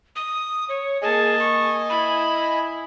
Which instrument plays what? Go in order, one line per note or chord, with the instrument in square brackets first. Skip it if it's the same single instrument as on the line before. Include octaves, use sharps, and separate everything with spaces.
[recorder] D#6
C#5
[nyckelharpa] A#3 A5 [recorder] G#4 [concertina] D#5 G#5
[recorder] C#6
[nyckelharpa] E4 [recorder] B5